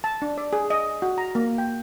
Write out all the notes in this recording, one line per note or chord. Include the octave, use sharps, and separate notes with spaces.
A5
D4
D5
G#4
D#5
F#4
A#5
A#3
G5